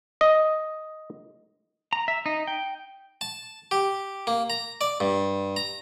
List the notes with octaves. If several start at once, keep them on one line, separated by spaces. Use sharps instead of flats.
D#5
A#5
E5
D#4
G5
A5
G4
A#3
A#5
D5
G2
A#5